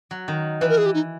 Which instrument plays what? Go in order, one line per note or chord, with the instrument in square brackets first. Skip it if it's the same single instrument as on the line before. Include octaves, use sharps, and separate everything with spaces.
[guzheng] F#3
D#3
[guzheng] E3 [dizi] B4
[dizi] A#4
G#4
G4
D#4